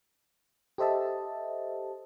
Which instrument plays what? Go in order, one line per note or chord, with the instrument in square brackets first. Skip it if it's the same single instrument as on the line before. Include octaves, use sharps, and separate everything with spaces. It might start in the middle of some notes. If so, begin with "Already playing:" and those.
[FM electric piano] G4 A4 C5 D#5 E5 A5